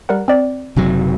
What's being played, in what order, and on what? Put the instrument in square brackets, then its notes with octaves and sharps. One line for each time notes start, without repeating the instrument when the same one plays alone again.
[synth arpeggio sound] G3 A#4 F#5
C4 D5
[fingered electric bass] F#1 C3 F#3